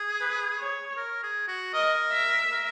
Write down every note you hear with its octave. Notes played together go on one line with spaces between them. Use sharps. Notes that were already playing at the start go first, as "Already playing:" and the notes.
Already playing: G#4
B4
C#5
A#4
G#4
F#4
A#4 D#5
E5
A#4